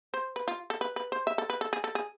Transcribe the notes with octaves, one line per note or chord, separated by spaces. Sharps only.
C5
B4
F4
A4
B4
B4
C5
E5
A4
B4
A4
G#4
A4
G#4